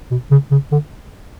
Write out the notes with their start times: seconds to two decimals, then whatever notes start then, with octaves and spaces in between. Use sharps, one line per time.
0.11 B2
0.31 C#3
0.51 C#3
0.71 D3